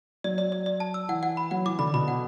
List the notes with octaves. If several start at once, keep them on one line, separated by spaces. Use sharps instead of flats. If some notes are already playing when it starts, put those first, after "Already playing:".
F#3 D5
D5
D5
D5
A5
E6
E3 F#5
F#5
B5
F#3 F#5
E3 D6
D3 B5
B2 B5
F#5